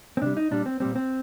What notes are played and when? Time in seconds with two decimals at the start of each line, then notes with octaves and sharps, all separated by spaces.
0.17 C4
0.22 C3 G3 D4
0.37 D#4
0.51 A#2 G3 D4
0.66 C4
0.80 A#2 G3 C4
0.96 C4